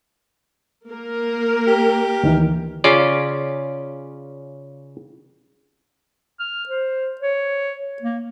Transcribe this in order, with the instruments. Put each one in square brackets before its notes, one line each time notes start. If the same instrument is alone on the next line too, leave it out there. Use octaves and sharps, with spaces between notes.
[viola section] A#3 A#4
[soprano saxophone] G4
[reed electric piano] D2 D#3 E3
[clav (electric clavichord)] C#3 C#4 F4 D5
[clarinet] F6
C5
C#5
A#3